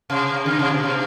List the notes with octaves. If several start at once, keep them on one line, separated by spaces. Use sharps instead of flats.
C3
D3
C3
B2
C3